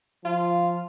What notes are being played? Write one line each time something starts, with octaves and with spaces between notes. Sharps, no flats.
F3 F4